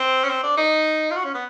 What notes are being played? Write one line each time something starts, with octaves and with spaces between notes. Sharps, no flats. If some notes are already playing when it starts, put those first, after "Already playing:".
Already playing: C4
C#4
C4
D4
D#4
F4
F#4
C#4
B3